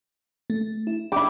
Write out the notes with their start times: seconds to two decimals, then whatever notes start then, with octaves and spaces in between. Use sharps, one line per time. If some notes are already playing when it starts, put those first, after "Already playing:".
0.50 A3
0.87 E4
1.12 E4 G5 D6